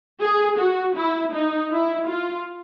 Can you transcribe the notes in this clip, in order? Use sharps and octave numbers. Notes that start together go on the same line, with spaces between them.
G#4
F#4
E4
D#4
E4
F4